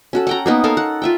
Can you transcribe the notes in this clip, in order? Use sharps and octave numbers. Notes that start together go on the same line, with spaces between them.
C#4 F#4 A4
F#5 G5 A#5
A#3 B3 D#4
A4 A#4 C#5 F5
F#5
F4 E5 G5